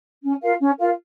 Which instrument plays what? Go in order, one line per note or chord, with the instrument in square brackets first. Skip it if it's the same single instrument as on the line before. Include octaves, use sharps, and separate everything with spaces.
[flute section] C#4
F4 A#4 F5
C#4
F4 A#4 F5